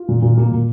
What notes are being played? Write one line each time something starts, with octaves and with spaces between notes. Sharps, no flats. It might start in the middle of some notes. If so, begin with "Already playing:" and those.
Already playing: F4
A#2
A#2
A#3
A#2